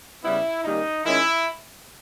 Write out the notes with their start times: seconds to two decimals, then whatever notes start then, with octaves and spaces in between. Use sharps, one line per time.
0.24 C#3 G3 B3 E4
0.64 D#3 G3 A#3 C#4 D#4
1.05 D#3 G#3 C#4 E4